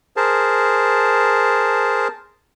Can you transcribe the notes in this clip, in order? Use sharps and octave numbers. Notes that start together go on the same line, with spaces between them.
G#4 A#4 C5 A5